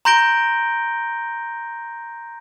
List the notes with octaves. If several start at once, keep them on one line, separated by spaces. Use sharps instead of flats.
A#5 C6 G6 A#6 D7 G7